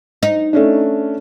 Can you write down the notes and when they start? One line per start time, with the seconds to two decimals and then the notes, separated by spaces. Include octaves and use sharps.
0.23 D#4
0.53 A3 C#4 D4